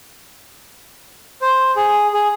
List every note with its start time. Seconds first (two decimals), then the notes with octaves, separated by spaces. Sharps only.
1.42 C5
1.76 G#4
2.13 G#4